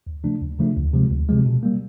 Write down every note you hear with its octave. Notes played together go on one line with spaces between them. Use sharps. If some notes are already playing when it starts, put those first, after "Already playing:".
D#2
C#3 F3 A3 D4
D#2
C#3 F3 A3 D4
D2
C3 F3 G#3
D2
C3 F3 G#3
B2
G3 A#3